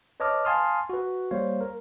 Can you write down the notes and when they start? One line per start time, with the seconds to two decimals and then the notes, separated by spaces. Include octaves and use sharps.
0.20 B4 C#5 D#5 A5 D6 F6
0.45 F5 G#5 A5 C6 D#6 F6
0.89 F#4 B4
1.31 G3 A#3 C5 C#5 F5
1.61 A#4